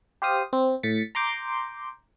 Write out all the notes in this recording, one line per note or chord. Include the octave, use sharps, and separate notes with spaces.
G4 C5 F5 D#6
C4
A2 A6 B6 C#7
A#5 C6 D6 G6